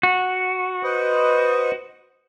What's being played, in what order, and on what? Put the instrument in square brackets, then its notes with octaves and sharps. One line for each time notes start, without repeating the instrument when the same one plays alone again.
[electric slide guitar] F#4
[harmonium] B4 C5 D#5